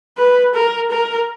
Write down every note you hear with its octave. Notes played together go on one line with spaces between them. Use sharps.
B4
A#4
A#4